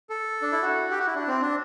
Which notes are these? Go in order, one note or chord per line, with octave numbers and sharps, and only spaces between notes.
A4
D4
E4
F#4
G4
F#4
E4
D4
C4
D4